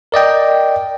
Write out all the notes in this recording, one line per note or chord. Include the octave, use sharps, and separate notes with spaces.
A#4 D5 D#5 G5